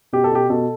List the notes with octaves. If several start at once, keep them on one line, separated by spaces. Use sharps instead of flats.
B2 G4
A4
B2 G4
B2 A4